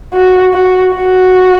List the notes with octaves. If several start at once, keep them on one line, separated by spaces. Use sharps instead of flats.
F#4
F#4
F#4